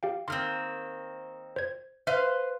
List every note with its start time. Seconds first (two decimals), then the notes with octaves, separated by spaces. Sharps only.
0.03 G4 F5 G5
0.28 D#3 A#3 C4 C6 F6
1.56 C5 G#6
2.07 B4 C5 E5 F5